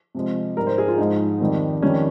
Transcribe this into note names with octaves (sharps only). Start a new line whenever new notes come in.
C3 F3 G#3
G#2 G3 A#4
C5
G#4
F4
G#2 F3 G#3 D#4
F2 D#3 G3
F2 D#3 G3 C#4